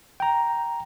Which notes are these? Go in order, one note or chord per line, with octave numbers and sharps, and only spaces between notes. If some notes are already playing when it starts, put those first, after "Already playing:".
G5 A#5